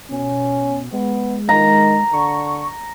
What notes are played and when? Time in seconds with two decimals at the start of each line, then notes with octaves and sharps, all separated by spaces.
0.11 B2 C#4
0.93 G#3 B3
1.49 D#3 A#5
2.13 D3 C#6